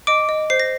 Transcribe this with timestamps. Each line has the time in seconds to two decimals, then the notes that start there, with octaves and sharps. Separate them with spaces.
0.07 D#5 D6 D7
0.29 D#5
0.50 C5 C7
0.60 A#6